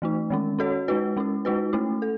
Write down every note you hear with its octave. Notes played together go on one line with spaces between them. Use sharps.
E3 A3 D#4
D#3 G#3 C#4
C#4 F#4 A4 C#5
G#3 D#4 F#4 B4
G#3 C#4 E4
G#3 D#4 F#4 B4
A3 C#4 E4
A4